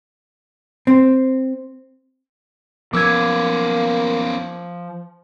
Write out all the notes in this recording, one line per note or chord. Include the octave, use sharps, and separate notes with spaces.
C4
F3 A#3 B3 C#4 D6 E6 G#6